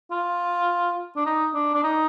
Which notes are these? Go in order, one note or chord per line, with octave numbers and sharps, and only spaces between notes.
F4
D4
D#4
D4
D4
D#4